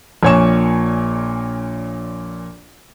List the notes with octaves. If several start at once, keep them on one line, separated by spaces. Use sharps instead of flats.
A#1 A#2 C#5 G#5 C#6 E7